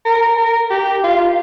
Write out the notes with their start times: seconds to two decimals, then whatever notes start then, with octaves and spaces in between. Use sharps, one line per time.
0.05 A#4
0.37 A#4
0.70 G4
1.03 F4